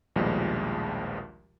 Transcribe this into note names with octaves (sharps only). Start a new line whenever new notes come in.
A#1 D#2 B2 F3 G3 G#3